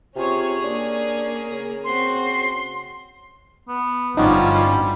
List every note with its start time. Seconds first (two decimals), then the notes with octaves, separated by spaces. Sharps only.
0.16 C3 C#4 F4 G#4 C#5
0.63 A#3 D4
1.51 C#3
1.84 C4 F#4 C6
3.68 B3
4.17 G1 F3 G3 C#4 D#4 F4 F#4 D5